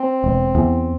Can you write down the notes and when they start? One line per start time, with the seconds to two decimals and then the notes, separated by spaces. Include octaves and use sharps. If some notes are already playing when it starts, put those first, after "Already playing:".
Already playing: C4
0.24 E1
0.55 E2